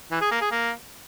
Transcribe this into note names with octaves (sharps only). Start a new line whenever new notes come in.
E3
G#4
A#3
G#4
A#3